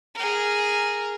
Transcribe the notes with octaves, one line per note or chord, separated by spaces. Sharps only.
G#4 A#4